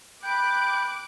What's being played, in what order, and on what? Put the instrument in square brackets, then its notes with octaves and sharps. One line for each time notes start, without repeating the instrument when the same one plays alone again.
[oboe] G5 [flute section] B5 [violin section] D6 F#6 D7